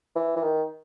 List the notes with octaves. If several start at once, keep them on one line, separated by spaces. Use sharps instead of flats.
E3
E3
D#3